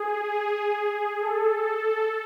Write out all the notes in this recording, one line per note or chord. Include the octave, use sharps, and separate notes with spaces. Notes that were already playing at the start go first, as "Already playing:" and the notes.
Already playing: G#4
A4